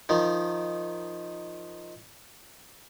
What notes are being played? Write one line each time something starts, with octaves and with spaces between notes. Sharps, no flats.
D#3 F3